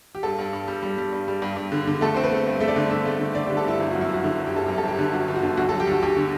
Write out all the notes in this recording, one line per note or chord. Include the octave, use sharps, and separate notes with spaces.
G4
G2 A4
G2
G2
G3
G3
G3
G2
G3
G2
G2
D3
D3
A3 A4
C4 C5
B4
A3
G2
A3 E5
D5
D3
D3 E5
A3
D3
D3 D5
G4
D3
A4
G2 E4
G1 E4
F#4
F#2
E4
F#2 F#4
D3 E4
G1
G4
G1 A4
F#2 G4
A4
G1 G4
D3
F#2 F#4
G1
F#4
D3
D2 F#4
A4
F#3
G4
D2 F#4
D2 G4
D3